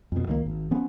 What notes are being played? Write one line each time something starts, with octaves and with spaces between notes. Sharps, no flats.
F2 B2
C#2 D#3 F#3 A#3
G#1
F3 B3 C#4